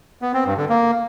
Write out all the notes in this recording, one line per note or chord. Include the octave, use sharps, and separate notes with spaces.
B3
C4
G2
D3
A#3